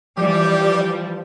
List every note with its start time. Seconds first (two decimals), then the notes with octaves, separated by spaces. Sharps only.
0.18 E3 F3 G3 G4 D5